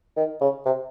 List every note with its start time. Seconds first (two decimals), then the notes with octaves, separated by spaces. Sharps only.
0.17 D#3
0.41 C#3
0.65 C3